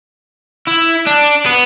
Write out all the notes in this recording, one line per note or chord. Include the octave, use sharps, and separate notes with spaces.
E4
D4
B3